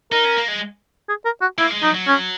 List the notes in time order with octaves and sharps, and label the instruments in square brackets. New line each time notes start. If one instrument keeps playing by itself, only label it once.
[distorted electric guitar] D#4 [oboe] A#4
[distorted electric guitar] C#4
A#3
G#3
[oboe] G#4
A#4
F#4
[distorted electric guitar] A#3 [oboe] E4
[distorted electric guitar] G#3
[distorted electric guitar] F#3 [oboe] D#4
[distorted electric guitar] F#3
[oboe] C#4